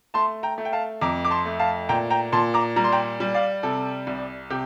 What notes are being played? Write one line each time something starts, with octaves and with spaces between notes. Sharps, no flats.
A3 A5 C6
G5 A#5
A3
G5
F5 A5
F2 A#5 D6
D6
A5 C6
A3
F5 A5
A#2 G5 A#5
G5 A#5
A#2 A5 C6
A#5 D6
G3 A#5
C6
G5 A#5
G3
D5 F5
C3 A4
C2
C3 G4